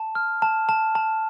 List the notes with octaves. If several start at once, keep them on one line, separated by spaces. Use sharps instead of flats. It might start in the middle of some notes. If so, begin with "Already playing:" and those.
Already playing: A5
F6
A5
A5
A5